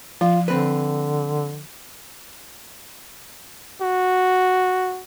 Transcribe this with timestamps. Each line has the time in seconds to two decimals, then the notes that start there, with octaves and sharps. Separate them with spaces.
0.21 F3 F4
0.48 D3 C4 B4
3.82 F#4